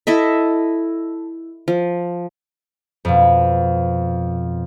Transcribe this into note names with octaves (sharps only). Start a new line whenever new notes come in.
E4 A4 D#5 E5
F3
F2 B2